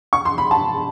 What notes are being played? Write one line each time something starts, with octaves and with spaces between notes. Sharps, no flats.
C#6
C6
B5
A5